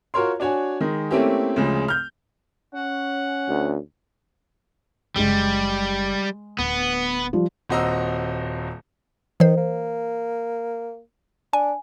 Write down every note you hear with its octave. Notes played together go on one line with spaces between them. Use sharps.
F4 F#4 A#4 C#5 C6
D4 F#4 C#5 G#5
D#3 G#3
A3 A#3 C4 C#4 E4 G4
D2 C#3 F3 G#3
F6 G6
C#4 F#5
D2
F#1 C#3 G3 G#3 G#4
D1 B3
F3 G3
D#1 C4 F#4 D#5 A#5 E6
D#3 E3 C5
A#3
D4 G#5